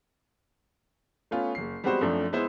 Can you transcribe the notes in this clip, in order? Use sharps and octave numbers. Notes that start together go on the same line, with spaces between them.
A3 B3 C#4 F4
F#1 C7
G3 G#3 B3 C4 F#4 C5
F#2 F3 A3 C4 D4
G#3 B3 E4 C5